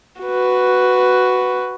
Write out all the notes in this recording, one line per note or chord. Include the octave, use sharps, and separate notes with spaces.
F#4 B4